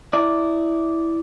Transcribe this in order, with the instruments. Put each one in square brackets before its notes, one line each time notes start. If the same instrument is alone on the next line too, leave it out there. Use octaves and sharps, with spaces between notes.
[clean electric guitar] E4 D5